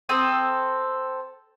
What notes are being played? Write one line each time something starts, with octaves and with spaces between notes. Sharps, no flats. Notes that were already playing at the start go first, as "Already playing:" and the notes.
C4 A4 D#6